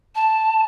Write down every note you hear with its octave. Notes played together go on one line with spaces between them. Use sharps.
A5